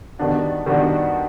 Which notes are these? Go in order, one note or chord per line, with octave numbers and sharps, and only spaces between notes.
D#3 G3 B3 D4 F#4
D#3 G3 B3 D4 F#4